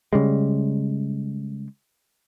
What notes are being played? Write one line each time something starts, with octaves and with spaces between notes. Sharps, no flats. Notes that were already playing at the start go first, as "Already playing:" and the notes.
C#3 G3 G#3